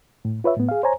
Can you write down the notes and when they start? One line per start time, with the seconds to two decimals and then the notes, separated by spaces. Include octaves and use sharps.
0.25 A2
0.44 F4 B4 C#5 E5
0.57 A2 B3
0.69 G#4 F5
0.83 C5 C#5 G#5 A#5